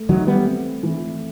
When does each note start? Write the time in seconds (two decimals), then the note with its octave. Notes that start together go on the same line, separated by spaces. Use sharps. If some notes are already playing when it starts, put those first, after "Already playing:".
Already playing: A3
0.09 D#3 E3 F#3
0.27 G3 B3
0.46 C4
0.83 E3